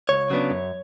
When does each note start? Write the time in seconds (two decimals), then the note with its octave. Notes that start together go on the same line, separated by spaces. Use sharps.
0.09 C#2 C#5
0.30 C#3 F#3 B3 D4
0.50 F#2